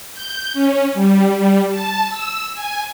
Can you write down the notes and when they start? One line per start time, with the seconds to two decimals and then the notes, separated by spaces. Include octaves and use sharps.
0.14 G6
0.53 C#4
0.94 G3
1.38 G3
1.71 A5
2.07 E6
2.54 G#5